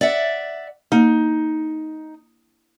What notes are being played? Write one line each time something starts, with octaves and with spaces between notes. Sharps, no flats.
D5 E5 F#5
A#3 D#4